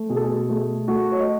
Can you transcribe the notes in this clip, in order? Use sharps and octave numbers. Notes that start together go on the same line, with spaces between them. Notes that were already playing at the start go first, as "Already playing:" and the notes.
Already playing: A3
B2 G#4
A4
G#4
A3 G#4
A3 F#4
C#5
D#5